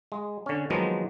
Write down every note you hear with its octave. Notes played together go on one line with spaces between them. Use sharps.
G#3
D3 C#4
D#3 F3 F#3 G#3 A#3 B3